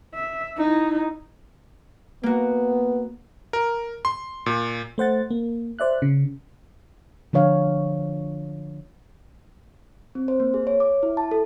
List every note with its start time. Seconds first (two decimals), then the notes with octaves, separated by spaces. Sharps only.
0.15 E5
0.57 D#4 E4
2.23 A#3 B3 F#4
3.53 A#4
4.05 C6
4.46 A#2
4.98 A3 C5 F#5 A6
5.31 A#3
5.79 C5 D5 E5 F#6
6.02 C#3
7.33 D3 F3 D4 C#5 F5
10.15 C4
10.28 C5
10.40 A#3
10.54 G#4
10.67 C#5
10.80 D6
11.03 E4
11.17 A5
11.31 A4